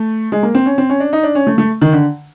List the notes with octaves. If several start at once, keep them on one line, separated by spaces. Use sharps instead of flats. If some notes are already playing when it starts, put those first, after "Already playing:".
Already playing: A3
G#3
A#3
C4
C#4
C4
C#4
D4
D#4
D4
C#4
A3
A3
D#3
D3